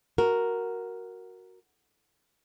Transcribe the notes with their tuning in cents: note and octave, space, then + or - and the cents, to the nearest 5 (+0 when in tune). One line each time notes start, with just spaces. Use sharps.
F#4 +0 A#4 +0